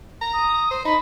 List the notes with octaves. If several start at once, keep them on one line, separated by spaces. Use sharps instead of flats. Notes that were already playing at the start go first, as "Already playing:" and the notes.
A#5
D#6
C5
D#4 B5